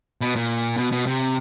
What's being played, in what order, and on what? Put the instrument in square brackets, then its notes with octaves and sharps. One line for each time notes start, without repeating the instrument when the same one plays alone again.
[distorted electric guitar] B2
A#2
B2
B2
C3